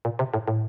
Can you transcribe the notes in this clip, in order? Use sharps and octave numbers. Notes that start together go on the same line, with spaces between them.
A#2
C3
A2
A2